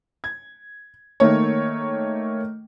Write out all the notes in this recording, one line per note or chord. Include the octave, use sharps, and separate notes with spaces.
G#6
D#3 A3 A#3 C#5